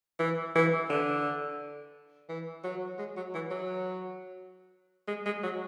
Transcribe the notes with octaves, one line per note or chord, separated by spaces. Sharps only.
E3
E3
D3
E3
F#3
G#3
F#3
E3
F#3
G#3
G#3
F#3